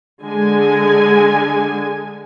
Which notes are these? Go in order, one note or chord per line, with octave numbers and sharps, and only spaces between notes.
D3 G#3 G#5